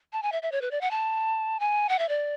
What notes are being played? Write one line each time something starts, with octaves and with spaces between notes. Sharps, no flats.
A5
G#5
E5
E5
C#5
B4
D5
F#5
A5
G#5
F#5
E5
D5